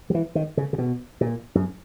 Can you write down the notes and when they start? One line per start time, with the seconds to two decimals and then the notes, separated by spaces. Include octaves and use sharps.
0.10 F#3
0.15 E3
0.35 D#3
0.57 C#3
0.73 C#3
0.78 B2
1.21 A#2
1.55 F#2